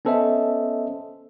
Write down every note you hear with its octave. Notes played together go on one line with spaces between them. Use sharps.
B3 C#4 A4 C5 D#5 E5